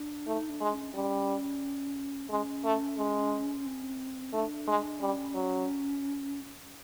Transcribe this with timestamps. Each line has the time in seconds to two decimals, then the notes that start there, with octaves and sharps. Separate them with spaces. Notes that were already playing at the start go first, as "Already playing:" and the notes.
Already playing: D4
0.27 A3 D#4
0.50 D4
0.61 G#3
0.72 C#4
0.94 G3 C#4
2.30 G#3 C#4
2.64 A3
2.98 G#3
3.66 C4
4.33 A3 D#4
4.38 D4
4.67 G#3
5.01 G3 C#4
5.35 F#3